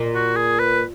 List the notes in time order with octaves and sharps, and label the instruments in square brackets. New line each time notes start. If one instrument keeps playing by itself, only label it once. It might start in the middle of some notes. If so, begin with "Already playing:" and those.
Already playing: [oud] A#2
[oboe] F#4
G#4
B4